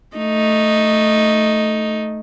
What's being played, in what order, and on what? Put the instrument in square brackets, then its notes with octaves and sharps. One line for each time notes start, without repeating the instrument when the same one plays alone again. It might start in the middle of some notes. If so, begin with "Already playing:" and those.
[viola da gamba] A3 D#4